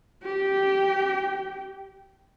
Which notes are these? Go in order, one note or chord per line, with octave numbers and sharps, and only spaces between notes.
G4 G5